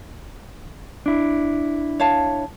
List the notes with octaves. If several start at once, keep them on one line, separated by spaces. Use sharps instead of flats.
D4 E4
C#5 F5 A5